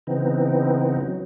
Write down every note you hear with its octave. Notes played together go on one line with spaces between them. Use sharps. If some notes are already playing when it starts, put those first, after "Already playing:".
C#3 E3 B3 C4 D#4
F#3